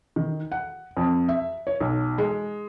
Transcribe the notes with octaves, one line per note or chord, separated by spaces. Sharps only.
D#3
F#5
F2
E5
C#5
B1
G#3